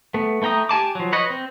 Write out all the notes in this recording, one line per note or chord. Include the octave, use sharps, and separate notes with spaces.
A3 B3
A3 E4 G5 A#5 D#6
G4 G#5 A5 D6
F3 F#3
B4 C#5 D#5
C4